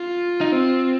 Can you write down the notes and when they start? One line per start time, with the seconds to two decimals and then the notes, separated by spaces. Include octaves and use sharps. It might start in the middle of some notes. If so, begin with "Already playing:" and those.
Already playing: F4
0.41 D#4
0.52 C4